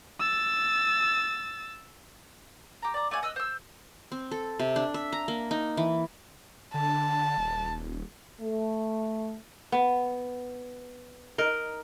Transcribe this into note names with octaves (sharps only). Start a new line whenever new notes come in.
E6 A6
G4 A#5
D5 A#5
A3 F#4 D5 G#5
D#5 E6 F#6
C5 E6
C4
A4
C3
D4
E5
A#5
A#3
D#4
E3
D3 A5
D#1
A3
B3
D#4 A#4